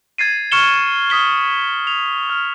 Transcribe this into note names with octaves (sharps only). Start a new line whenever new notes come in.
G#6 A6 C7 D#7
C#6 F6 C#7 E7 G7
D#6 B6 G7
F7
F6